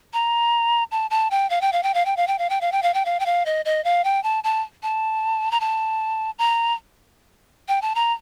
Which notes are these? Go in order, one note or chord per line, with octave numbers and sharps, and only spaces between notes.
A#5
A5
A5
G5
F5
G5
F5
G5
F5
G5
F5
G5
F5
G5
F5
G5
F5
G5
F5
G5
F5
D#5
D#5
F5
G5
A5
A5
A5
A#5
A5
A#5
G5
A5
A#5